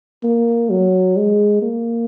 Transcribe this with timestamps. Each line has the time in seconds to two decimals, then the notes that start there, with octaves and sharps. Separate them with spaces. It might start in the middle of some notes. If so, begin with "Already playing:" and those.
0.23 A#3
0.70 F#3
1.17 G#3
1.62 A#3